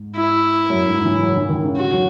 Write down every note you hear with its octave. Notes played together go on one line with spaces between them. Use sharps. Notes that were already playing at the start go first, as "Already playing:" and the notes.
Already playing: G#2
E4
F#2
G#2
E3
F#3
E3
D#3
C#3
F#4
F#3